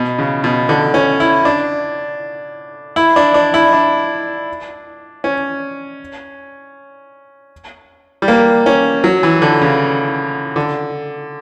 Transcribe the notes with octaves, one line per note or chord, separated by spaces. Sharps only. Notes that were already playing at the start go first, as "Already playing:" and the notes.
Already playing: B2
C#3
B2
D3
C#4
E4
D4
E4
D4
D4
E4
D4
C#4
G3
A#3
C#4
F#3
E3
D3
C#3
D3